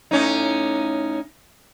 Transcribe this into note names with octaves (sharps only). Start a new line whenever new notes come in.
A2 C#4 D#4